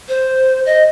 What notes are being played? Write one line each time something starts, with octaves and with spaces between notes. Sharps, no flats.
C5
D#5